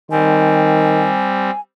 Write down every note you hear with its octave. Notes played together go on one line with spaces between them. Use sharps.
D#3 G3 C4 G#5